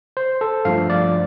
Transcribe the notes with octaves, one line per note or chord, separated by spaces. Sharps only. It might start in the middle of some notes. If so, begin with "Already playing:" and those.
C5
A4
G2 F3 A3 F5
D5